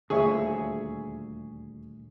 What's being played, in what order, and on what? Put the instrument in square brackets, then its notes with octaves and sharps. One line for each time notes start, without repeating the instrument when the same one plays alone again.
[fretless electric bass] D#1 D2 A#2 [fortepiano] G#4 C#5 E5